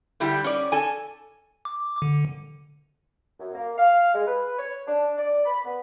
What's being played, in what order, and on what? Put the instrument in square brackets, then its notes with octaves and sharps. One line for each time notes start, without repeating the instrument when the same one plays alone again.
[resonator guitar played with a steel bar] D3 G3 E4 G4
C#4 D5
A4 G#5
[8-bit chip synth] D6
D3
[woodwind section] F#2
A#3
F5
G#3
B4
C#5
D4
D5
B5
B3